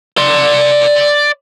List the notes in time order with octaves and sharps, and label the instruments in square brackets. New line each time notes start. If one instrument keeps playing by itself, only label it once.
[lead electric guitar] D5 C6